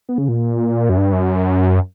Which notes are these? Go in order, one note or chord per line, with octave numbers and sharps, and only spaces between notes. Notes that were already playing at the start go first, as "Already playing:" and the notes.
B3
C#3
A#2
F#2
G2
F#2